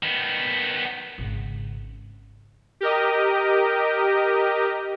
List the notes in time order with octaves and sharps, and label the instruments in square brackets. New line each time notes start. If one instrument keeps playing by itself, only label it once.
[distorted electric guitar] D#3 B3
[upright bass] G#1 C#3
[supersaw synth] G4 A#4 D#5